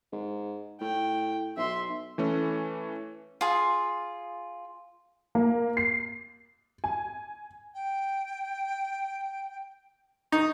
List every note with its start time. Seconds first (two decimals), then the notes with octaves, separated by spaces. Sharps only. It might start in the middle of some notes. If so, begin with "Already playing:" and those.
0.13 G#2
0.81 A2 G5
1.57 B1 E5 C6
2.18 E3 A3 C#4
3.41 F4 G#4
5.35 A#3
5.77 C7
6.84 G#5
7.74 G5
10.32 D#4 C#6